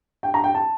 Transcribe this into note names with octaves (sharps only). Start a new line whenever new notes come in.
G5
A#5
G5
A5